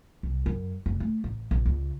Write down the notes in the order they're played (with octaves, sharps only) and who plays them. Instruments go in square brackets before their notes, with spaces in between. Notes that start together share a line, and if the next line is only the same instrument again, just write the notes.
[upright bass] C2
F#2
F1
A3
A1
A#1
C#2